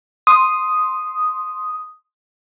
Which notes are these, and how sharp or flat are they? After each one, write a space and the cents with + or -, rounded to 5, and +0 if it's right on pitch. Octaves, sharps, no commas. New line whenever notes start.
C6 +0 D#6 +0